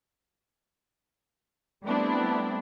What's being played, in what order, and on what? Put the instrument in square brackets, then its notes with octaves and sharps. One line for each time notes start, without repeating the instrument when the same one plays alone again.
[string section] G3 A3 B3 C4 D4 E4